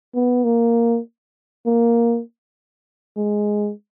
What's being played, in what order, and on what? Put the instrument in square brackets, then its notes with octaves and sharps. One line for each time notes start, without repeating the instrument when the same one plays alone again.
[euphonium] B3
A#3
A#3
G#3